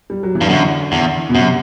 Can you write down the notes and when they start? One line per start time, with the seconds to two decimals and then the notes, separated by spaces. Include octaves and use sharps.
0.10 G3
0.23 F#3
0.35 E3
0.41 G2
0.48 F#2 D3
0.92 E2
1.29 B2
1.34 F#2 C3